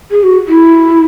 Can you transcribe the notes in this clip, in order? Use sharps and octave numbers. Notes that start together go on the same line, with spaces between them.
G#4
F#4
E4